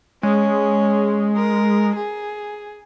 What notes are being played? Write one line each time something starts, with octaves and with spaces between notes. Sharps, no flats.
G#3 C#4
A#4
G#4